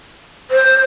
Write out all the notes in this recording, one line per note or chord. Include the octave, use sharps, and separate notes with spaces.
C5